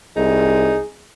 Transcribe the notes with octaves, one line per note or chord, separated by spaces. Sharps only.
C2 D#4 G#4